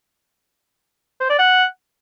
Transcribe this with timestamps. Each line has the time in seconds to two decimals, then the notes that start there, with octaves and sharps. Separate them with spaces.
1.20 C5
1.30 D5
1.39 F#5